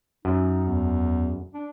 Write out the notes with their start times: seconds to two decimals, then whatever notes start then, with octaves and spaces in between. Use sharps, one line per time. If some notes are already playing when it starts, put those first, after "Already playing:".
0.25 F#2 D#4
0.64 E2
1.54 D4